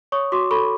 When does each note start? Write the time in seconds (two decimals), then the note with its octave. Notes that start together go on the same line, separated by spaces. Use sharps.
0.12 C#5 C#6 D#6
0.32 F#4 C6 D6
0.51 A4 B5 C#6